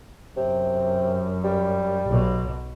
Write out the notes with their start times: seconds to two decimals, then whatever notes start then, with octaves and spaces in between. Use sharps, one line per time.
0.37 F#2 C3
1.44 G3
2.07 B1 B2